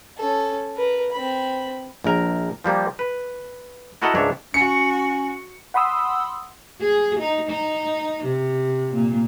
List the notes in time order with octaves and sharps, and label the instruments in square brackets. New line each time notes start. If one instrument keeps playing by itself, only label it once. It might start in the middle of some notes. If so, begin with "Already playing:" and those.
[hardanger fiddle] C#4 A4
A#4 B4
C4 B5
[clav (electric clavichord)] A#1 A#4
F3 G3 A#3
B4
E4 F#4 A4 A#4 D#5 F#5
C#2 G#2 D4 C#5 E5
[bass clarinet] C#4 [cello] F#4 [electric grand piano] C#7
[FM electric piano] F#5 B5 C6 D#6 E6
[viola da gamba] G#4
D#4
D#4
C3
A#2